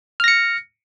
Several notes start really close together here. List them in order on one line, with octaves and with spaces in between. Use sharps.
F6 A#6 C#7